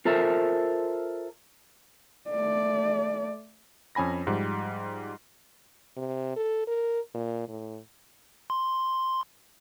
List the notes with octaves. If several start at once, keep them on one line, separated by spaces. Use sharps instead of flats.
F4 A4 A#4 C5 E5
A3 D5
F2 C#4 G#5 B5 A#6
G#2 F3 G3
C3
A4
A#4
A#2
A2
C6